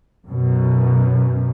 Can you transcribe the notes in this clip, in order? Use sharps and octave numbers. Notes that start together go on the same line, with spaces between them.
F#2 B2